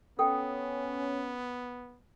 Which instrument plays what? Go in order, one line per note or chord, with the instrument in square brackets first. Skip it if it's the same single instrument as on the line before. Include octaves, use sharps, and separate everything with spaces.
[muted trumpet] B3 [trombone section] C#4 [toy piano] A4 G5